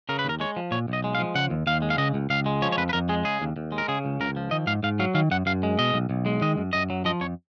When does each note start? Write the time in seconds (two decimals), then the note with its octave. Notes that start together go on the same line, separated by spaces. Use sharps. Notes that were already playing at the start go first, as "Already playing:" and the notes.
0.09 C#3 A#4
0.19 B4
0.25 D#2 A#4
0.40 G#3 C#5
0.57 F3
0.71 A#2 C#5
0.88 B1 D#5
1.04 G#3
1.15 F5
1.19 F3
1.35 C#3 F#5
1.50 D#2
1.67 D#2 F5
1.82 G#3
1.90 F5
1.98 C#3 D#5
2.14 C#2
2.30 C#2 F5
2.46 G#3
2.62 F3 C#5
2.72 C#5
2.78 F2 B4
2.89 B4
2.93 F2 A#4
3.09 G#3 G#4
3.25 C#3 G#4
3.42 D#2
3.56 D#2
3.72 G#3
3.78 A#4
3.88 C#3 G#4
4.05 C#2
4.20 C#2 A#4
4.36 F3
4.51 D#3 D#5
4.67 G#2 F5
4.83 G#2 F5
4.99 F#3 F5
5.14 D#3 F5
5.31 F#2 F#5
5.46 F#2 F5
5.63 G#3
5.78 B2 D#5
5.94 B1
6.09 B1
6.26 G#3
6.41 D#3 D#5
6.58 F#2
6.73 F#2 D#5
6.90 F#3
7.05 F3 D#5
7.21 F2 C#5